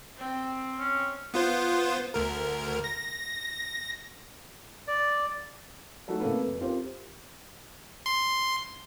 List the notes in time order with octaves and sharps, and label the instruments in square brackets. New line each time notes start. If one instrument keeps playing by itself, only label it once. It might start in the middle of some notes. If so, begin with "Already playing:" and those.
[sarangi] C4
[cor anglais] C#4
[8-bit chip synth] B3 F4 C5
D2 A#4
A#6
[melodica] D5
[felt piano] F#3 A3 C#4 D#4 F#4
C3 A3 A#3 A4 B4
F1
C4 F4 G4 A#4 C5
[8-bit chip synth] C6